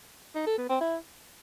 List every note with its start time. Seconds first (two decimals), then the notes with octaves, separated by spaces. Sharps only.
0.35 D#4
0.46 A4
0.58 B3
0.69 C4
0.81 E4